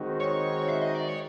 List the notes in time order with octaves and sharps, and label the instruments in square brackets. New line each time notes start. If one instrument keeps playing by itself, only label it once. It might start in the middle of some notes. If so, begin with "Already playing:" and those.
Already playing: [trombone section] D#3 G#3 C4 D#4 F#4
[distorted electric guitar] C#5
E5
D#5
D5
C#5